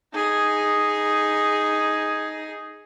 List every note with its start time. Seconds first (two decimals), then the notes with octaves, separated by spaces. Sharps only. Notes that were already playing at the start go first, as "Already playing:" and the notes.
0.14 D#4 G#4